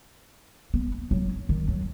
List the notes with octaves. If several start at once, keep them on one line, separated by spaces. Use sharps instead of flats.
B3
F#3
D#3
F#3